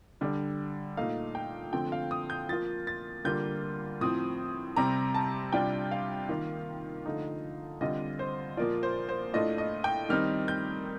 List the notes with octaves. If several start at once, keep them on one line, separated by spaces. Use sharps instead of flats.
D3 G3 D4
A#2 A3 D#4 F5
G5
D3 F3 A3 C4 G5
F5
D#6
G6
F3 A#3 F4 A6
A6
D3 G3 A#3 F4 G6
A2 F3 C4 D#6
C3 G3 C4 A#5
A5
C3 G3 D4 F4 G5
F5
D#3 A#3 F4
D3 F3 A3 D#4
D3 G3 C4 F4 D#5
C5
A#2 F3 A#3 F4 D5
C5
C5
A2 A3 D4 F4 D#5
D#5
G5
D#3 G3 C4 D#4 F6
G6